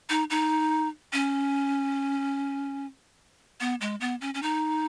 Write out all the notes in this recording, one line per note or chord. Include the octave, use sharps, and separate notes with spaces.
D#4
D#4
C#4
B3
G#3
B3
C#4
C#4
D#4